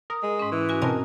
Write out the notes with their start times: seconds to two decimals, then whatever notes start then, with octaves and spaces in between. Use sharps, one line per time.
0.10 A#4 D#6
0.23 G#3
0.39 G#2 C#4
0.52 E3
0.69 C#4 F#4 G#5 A#6
0.82 B2 C4 A#4 D#5 G#5 A5